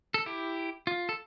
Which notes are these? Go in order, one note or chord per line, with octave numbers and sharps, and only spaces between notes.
A4
E4 G4
F4
A4